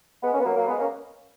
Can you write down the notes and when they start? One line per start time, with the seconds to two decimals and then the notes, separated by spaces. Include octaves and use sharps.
0.23 G#3 B3
0.34 A#3 C#4
0.39 B3
0.45 F#3 A#3
0.56 F#3 A#3
0.67 G#3 B3
0.78 A#3 C#4